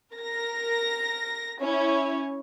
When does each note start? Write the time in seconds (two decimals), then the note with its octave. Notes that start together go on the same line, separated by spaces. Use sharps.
0.15 A#4 A#6
1.60 C#4 E4 C#5